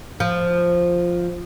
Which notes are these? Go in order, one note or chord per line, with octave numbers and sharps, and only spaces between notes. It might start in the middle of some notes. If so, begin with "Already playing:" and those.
F3